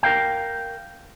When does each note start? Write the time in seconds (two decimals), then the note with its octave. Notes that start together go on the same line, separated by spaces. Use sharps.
0.03 A#4 F5 G5